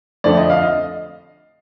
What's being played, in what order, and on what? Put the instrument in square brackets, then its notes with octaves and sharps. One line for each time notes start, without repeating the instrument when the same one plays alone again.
[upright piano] F2 D3 F3 A3 D5
D#5
F5
D#5